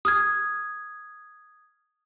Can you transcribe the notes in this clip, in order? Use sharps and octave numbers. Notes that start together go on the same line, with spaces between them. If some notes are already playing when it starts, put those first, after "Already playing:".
D#6 F6 G#6